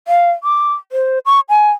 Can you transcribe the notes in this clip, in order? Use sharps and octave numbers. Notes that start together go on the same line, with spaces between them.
F5
D6
C5
C#6
G#5